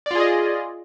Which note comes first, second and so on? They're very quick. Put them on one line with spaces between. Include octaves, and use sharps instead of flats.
D5 F4 G#4 D#5